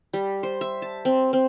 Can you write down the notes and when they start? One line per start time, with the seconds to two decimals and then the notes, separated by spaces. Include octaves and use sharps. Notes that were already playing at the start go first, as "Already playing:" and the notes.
0.13 G3
0.43 C5
0.61 E5
0.82 A5
1.05 C4
1.33 C4